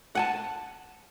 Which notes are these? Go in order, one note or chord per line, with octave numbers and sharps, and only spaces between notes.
F#5 G#5 A5